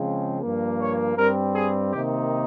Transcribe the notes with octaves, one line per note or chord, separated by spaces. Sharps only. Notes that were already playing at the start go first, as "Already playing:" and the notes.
Already playing: C#3 F3 G#3 C4
G2 F3 A#3
C#5
G2 G3 C4 A#4
G#4
C3 D#3 A#3 D#4 G4